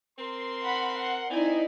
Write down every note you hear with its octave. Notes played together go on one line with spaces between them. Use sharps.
C4 A#4 C6
F#5 B5
F#5
C4 D#4 E4 D5 G#5